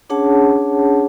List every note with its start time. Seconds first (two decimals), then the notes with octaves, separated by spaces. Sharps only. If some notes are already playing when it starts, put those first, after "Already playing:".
0.10 C#4 D4 G#4 C#5 F#5 A5